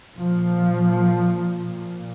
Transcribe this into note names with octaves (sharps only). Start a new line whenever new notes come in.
A#2 F3
A#2